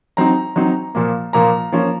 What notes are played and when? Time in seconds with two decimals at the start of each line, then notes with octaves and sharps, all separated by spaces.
0.17 F#3 C4 D#4 A#5
0.56 F#3 C4 D#4
0.95 A#2 F3 A#3
1.33 A#2 F3 A#3 A#5
1.72 F3 A#3 C#4 F4